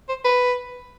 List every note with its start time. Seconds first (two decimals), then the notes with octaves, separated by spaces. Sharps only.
0.09 C5
0.25 B4